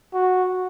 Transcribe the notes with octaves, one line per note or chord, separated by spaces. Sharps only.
F#4